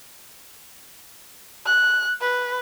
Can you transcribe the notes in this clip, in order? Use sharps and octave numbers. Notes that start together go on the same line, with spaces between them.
F#6
B4